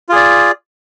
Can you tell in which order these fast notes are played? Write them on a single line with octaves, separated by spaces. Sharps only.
F4 G#4 D5